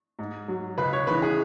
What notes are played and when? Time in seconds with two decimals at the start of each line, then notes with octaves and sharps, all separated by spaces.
0.19 G#2
0.48 F#3
0.78 C#2 B4
0.93 C#5
1.07 C#3 E3 B4
1.22 G#4